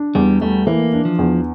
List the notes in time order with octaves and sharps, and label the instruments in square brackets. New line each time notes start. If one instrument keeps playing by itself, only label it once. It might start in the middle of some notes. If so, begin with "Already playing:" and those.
Already playing: [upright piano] D4
[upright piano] E2 [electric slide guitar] G3
[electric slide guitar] G3 [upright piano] A3
[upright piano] E3 [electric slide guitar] A#3
[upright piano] D4
[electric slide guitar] F3
[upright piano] E2